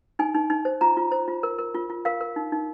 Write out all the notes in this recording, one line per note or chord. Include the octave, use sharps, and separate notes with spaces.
D#4 G#5
D#4
D#4
C5
F4 A#5
F4
C5
F4
A#4
A#4
F4
F4
A#4 F5
A#4
D#4
D#4